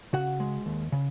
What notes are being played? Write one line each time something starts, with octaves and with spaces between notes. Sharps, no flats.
C#3 F#4 F#5
G#3
D#2
C#3